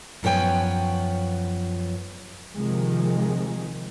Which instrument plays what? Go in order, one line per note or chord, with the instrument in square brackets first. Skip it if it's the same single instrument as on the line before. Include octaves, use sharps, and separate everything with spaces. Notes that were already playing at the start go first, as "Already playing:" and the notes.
[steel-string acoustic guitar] F#2 F3 B3 C#5 G5 G#5
[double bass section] C3 D#3 F3 G#3